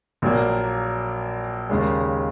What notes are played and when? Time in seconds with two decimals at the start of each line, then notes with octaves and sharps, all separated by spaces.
0.22 A#1 A#2 F#3 A#3
1.69 D#2 C#3 G#3